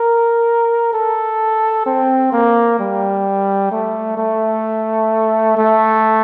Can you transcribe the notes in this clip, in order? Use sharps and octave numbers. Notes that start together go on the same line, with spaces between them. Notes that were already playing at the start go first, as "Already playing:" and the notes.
Already playing: A#4
A4
C4
A#3
G3
A3
A3
A3